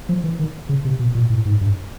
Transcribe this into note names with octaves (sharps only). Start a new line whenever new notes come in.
F3
E3
D#3
C#3
C3
B2
A#2
A2
G#2
G2